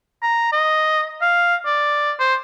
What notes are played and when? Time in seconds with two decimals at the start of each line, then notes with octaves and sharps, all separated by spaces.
0.22 A#5
0.52 D#5
1.21 F5
1.65 D5
2.19 C5